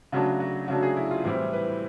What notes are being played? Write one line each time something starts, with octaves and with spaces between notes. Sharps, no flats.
C#3 F#3 A3 D4 F#4
F#4
C#3 F#3 A3 D4 F#4
G#4
E4
F4
A2 E3 G3 C4 E4
B4